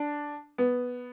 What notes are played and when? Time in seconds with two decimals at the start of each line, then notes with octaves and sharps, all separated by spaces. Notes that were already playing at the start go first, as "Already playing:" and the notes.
Already playing: D4
0.58 B3